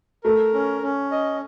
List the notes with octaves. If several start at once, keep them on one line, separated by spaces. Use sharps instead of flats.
A3 A#4
C#4
C#4
D#5